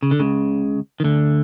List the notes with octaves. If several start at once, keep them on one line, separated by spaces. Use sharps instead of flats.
C#3
D3
C#2 C#3
D#3
D2 D3